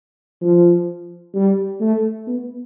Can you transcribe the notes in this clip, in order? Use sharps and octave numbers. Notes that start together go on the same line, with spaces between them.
F3
G3
A3
B3